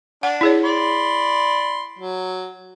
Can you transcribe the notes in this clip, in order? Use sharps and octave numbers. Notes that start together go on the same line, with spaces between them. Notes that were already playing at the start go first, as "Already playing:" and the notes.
D4 F#5
E4 G#4 C#5
D5 B5 C6
F#3